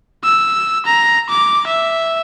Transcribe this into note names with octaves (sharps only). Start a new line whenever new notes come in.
E6
A#5
D6
E5